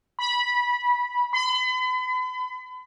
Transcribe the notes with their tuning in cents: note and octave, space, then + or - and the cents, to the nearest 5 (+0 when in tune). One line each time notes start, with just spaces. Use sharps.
B5 -20
B5 +40